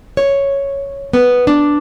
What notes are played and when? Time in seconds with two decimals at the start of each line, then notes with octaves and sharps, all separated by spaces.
0.17 C#5
1.13 B3
1.47 D4